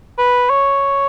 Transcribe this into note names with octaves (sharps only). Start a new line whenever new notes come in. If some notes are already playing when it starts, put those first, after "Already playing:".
B4
C#5